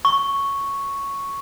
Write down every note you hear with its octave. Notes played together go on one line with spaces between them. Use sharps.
C#6